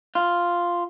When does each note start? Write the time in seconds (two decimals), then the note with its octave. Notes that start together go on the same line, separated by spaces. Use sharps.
0.15 F4